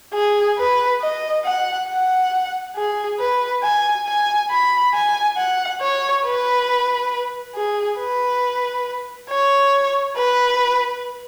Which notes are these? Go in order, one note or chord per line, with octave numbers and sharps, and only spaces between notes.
G#4
B4
D#5
F#5
F#5
G#4
B4
G#5
G#5
B5
G#5
F#5
C#5
B4
G#4
B4
C#5
B4